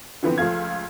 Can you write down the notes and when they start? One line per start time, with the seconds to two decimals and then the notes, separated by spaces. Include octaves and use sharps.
0.23 D3 E3 F3 B3 C4
0.38 C#2 F3 A3 F5 G#6